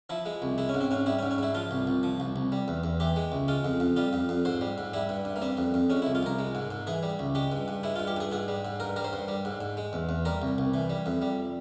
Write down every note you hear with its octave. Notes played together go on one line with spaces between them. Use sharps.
F3 E4
G#3
C2
G#3 E4
C#4
G#2
C4
G#2 C#4
G3 E4
C#4
G#2
C#4
G#2 E4
F3 F4
C2
C2
F3
C2
C2
G3
E2
E2
E3 G4
G#3
C#2
G#3 F4
F2
F2
G3 F4
F2
F2
G#2 C5
G3
G#2
G3 E4
G2
G2
A#3
G3 C4
F2
F2
G#3 C#4
E4
C2
F4
C2 A#4
G#3
G#2
G#2
E3 G#4
G3
C#2
G#3 G4
G2
G2
G#3 E4
F4
G2
G4
G2 G#4
G#2 G#4
G3
G#2
G2 A#4
G3 A#4
C5
G2
G3
G#2
G#2
G#3
E2
E2
G3 A#4
C2
C2
E3
G3
F2
G3